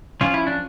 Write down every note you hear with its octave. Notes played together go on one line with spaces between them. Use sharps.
F3 C#4 F4
E4
D4